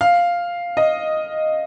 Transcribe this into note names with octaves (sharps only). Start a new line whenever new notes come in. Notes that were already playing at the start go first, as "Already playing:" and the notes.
F5
D#5